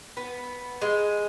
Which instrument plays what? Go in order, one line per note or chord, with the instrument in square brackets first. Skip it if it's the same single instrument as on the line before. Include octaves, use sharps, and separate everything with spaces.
[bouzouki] B3
G#3